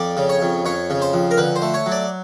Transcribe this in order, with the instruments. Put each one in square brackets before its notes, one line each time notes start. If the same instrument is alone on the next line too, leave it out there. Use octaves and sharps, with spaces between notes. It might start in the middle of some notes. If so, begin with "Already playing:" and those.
Already playing: [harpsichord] F2 D5
C#3
C#5
F2
F2 C#5
C#3
C5
F2
A#4
D3 B4
C5
A3
C#5
F#3
D5